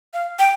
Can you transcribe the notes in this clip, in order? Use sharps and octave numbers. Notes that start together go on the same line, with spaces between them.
F5
G5